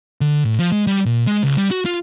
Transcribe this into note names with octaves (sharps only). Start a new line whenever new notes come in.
D3
A2
F3
G#3
G3
A#2
G#3
C#2
G3
F#4
F4